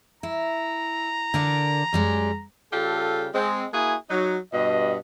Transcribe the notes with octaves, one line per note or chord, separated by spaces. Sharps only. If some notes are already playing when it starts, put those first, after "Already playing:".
E4 A#5
D3 A#4 D5
F#2 G3 G#3
C#3 G3 F4 G4 A4
G#3 C4
A#3 E4 F#4 G#4 G#5
F#3 D#4
G2 B2 D#5